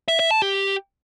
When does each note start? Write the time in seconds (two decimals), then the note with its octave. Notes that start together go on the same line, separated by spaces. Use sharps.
0.08 E5
0.20 E5
0.31 A5
0.42 G4